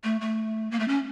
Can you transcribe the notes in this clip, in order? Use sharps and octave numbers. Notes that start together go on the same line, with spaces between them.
A3
A3
A#3
A3
C#4